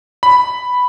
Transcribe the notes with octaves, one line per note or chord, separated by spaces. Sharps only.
B5